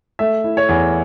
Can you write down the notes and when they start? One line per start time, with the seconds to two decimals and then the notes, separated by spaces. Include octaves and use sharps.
0.19 A3 E5
0.44 E4
0.57 C#5
0.69 E2